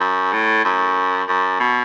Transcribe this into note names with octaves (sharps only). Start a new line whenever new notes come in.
F#2
A2
F#2
F#2
B2